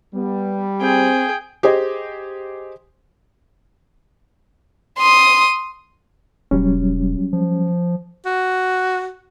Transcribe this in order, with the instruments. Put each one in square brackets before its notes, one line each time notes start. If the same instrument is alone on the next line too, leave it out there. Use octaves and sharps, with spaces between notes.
[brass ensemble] G3 [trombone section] B3
[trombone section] C4 [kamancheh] G#4 G5
[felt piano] G4 G#4 C5 D#5
[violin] C6 D#6
[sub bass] E1 [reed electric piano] F#3 G3 C#4
[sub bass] F3
[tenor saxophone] F#4